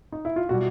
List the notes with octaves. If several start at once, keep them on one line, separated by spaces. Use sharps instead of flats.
D#4
E4
F4
B2 G3 F#4